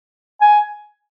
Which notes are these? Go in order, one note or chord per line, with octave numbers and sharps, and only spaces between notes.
G#5